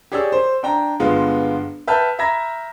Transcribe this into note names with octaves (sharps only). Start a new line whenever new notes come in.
G4 G#4 C#5 D5 E6
C5
D4 G5 A#5
G1 G#3 B3 F4
B4 E5 G5 A5 F6 G6
E5 A#5 B5 G#6 A#6